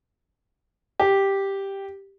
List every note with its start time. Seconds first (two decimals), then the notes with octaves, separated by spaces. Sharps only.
1.00 G4